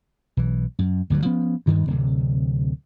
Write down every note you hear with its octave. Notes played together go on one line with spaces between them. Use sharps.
B1 E3
F#2
G1 D2 G2 F#3
F3 B3 C#4
D2 G2 D#3
D1 C3